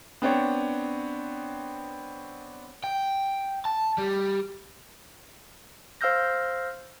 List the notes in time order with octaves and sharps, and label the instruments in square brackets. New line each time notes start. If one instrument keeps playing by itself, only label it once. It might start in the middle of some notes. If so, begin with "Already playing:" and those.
[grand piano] B3 C4 D4 C#5
[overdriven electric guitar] G5
A5
G3
[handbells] C5 F5 E6 F6 G6 A#6